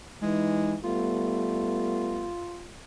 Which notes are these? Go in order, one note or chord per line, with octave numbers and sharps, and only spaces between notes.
E3 G#3 D#4
G3 A3 B3 F4